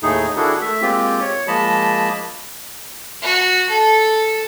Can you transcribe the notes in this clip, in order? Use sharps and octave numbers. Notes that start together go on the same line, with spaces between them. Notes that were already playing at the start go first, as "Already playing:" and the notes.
D#2 A2 A3 D#4 G#4
D#3 D4 E4 F#4 G#4 A4
A3 E5
G#3 A#3 C4 F4 G4
C#5
F3 G#3 A#3 D#5 A5 B5
F#4
A4